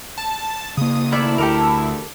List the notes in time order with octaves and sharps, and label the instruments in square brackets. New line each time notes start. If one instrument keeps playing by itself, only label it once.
[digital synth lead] A5
[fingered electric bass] C#3 A#3 [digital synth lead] D#6
[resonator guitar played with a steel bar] D#3 A3 D5 [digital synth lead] E4
[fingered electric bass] D2 [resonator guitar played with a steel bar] G4 A4 A#4